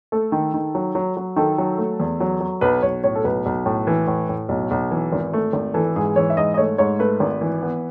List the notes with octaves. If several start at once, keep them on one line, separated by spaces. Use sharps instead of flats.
A3 A4
D#3
D#3
F#3
F#3
F#3
D#3 A4
F#3
A3
E2
F#3
F#3
B1 B4
B1 C#5
A2 C#5
A4
B1 B4
B1
A2
E3
A2
A2
B1
B1
E3
G#1
A3
G#1
E3 A4
G#2 G#4
E3 C#5
E5
G#2 D#5
D#5
A3 C#5
G#2 C#5
A3 B4
G#1
E3
B3